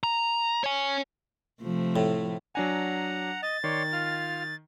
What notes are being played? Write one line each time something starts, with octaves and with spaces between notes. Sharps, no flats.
A#5
C#5 G#5
C3 F3 A3
A2
F#3 D4 F#5 G#5 A#5
D#5 A6
D#3 C#5 D5 C6
F4 F6